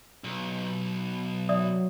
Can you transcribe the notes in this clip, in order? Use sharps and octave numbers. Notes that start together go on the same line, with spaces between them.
B1
F#3 D5 E5 D#6